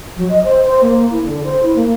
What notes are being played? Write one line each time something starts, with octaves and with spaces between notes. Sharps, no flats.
F#3
D#5
C5
C5
A#3
E4
D3
C5
E4
A#3